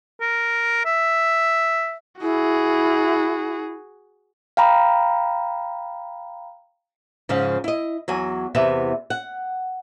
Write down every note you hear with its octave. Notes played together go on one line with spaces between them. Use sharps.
A#4
E5
E4 F#4 G#4
F5 G5 A#5 B5
G#2 C#3 F3 C#4
E4 D#5
E2 F#3 G#5
E2 C3 B3 E5
F#5